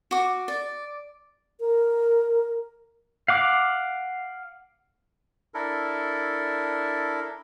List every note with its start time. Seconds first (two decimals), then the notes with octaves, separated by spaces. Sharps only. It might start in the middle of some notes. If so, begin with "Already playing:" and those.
0.11 F#4 D6
0.48 D5
1.60 A#4
3.28 F5 F#5 D6
5.54 D4 E4 A4 A#4